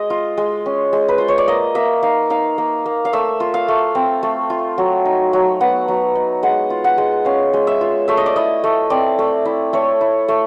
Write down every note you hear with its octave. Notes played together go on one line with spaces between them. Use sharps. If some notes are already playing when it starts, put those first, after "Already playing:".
Already playing: G#3 D#5
F4
G#3
C#4
G#3
B4
F4 C5
C#5
D5
A#3 D#5
A#3 E5
D#4 F5
D#4 F5
A#3
A#3
F5
A3 E5
F4
F5
A3
C4
A3
F4
F#3
D#4
F#3
B3 F#5
F#3
D#4
G#3 F#5
F4
F#5
G#3
C#4 F5
G#3
E5
F4
A3 E5
D#5
D5
E4 D#5
A3
C4 D5
A3
E4
A3 C#5
E4
A3